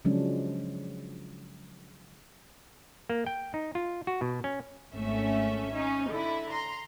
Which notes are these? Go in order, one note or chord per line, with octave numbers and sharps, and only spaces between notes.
C#3 F3 F#3 G#3 C#4 D4
A#3
G5
D#4
F4
F#4
B2
C#4
G#1 A3 C#4 E5
C#4 D#4
D3 E4
A#5 C6